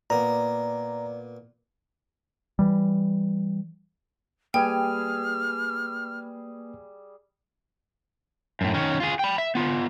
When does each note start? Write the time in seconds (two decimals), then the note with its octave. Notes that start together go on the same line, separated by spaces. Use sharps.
0.10 A#2 B3 D5 A#5
2.59 E3 G3
4.54 G3 A#3 G#4 B4 G5 G#5 F6
8.61 F#2 A2
8.74 D#3 C#4
9.00 F4 G#4
9.19 G5 B5
9.38 E5
9.55 B3 F4